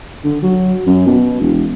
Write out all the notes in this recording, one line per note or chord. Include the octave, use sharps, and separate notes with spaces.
D3
F#3
F#2
B2
E1